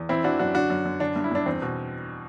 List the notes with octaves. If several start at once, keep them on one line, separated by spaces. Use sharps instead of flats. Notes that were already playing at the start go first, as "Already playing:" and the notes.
Already playing: E2
E3 C4 E4
E3 D4 F#4
F#2 D4 F#4
D3 D4 F#4
F#2
F#2
D3 D4
G2
E4
G2 D4
E2 C4
B2